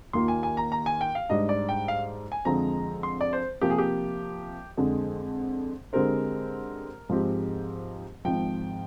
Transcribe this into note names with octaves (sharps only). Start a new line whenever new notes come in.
D#2 D#3 A#3 F4 C6
G#5
G#5
A#5
A#5
G#5
G5
F5
G#2 G3 D4 D#5
D5
G5
F5
G#5
F2 D3 F3 G#3 C4 A#5
C6
D5
C5
C3 F3 A#3 G4
G#4
G4
F2 D3 G#3
D3 G#3 C4 G4 A#4 C5
G#2 F3 G#3 C4 G4
G#1 G#2 F3 G5